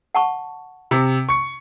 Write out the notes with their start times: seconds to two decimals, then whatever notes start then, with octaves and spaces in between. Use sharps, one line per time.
0.15 F#5 A5 C#6
0.91 C3
1.29 C#6 C#7